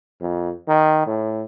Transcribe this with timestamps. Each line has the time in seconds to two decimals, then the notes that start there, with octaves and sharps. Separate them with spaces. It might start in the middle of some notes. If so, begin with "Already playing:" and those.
0.21 F2
0.68 D#3
1.07 A2